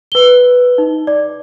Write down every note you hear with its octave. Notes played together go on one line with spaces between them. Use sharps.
B4 G7
D#4
D5